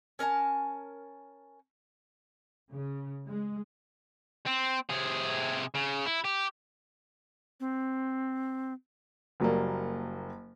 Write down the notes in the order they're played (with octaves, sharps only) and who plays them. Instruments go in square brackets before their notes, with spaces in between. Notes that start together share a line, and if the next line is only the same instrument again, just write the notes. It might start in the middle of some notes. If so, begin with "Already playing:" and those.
[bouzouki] C#4 A#4 G#5 A5
[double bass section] C#3
G#3
[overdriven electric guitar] C4
C3 G#4
C#3
E4
G4
[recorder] C4
[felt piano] F#1 F#3 G3 A#3